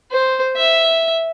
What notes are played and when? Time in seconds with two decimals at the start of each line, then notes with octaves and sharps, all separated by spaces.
0.11 C5
0.56 E5